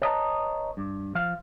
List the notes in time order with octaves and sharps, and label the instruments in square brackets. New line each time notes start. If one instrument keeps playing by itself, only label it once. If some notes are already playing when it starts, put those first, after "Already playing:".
[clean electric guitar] B4 C#5 D#5 E5 A5 A#5
G2
F3 F5